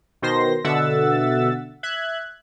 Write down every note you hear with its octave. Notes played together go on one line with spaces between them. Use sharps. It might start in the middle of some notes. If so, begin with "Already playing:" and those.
B2 D#3 C5 C6 A#6
B2 D3 E5 F#5 E6 A6
E5 F#6 G#6